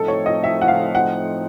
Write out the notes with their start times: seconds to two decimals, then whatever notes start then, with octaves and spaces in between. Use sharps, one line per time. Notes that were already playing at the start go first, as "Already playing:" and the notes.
Already playing: A2 F3 A3 C4 D#4 A4
0.08 C#5
0.26 D#5
0.44 E5
0.62 F#5
0.68 F5
0.95 F#5